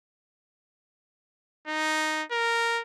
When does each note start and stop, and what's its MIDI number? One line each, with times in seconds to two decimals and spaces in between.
1.67 2.23 63
2.31 2.82 70